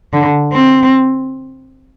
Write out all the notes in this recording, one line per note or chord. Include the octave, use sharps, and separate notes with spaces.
D3
C4